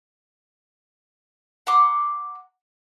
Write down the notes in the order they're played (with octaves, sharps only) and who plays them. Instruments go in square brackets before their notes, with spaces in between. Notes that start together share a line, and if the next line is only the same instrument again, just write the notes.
[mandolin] F#5 A#5 C6 D6